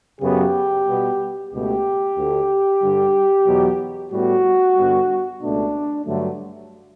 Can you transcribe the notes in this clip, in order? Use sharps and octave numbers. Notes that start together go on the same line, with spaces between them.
F#2 C#3 F#3 B3 G4
B2 G3 B3
C#2 B2 A3 G4
D2 D3 A3
G2 D3 G3
E2 B2 F#3
A2 G3 B3 F#4
G2 D3 G3 B3
C#2 B2 A3 D4
G2 D3 F#3 A3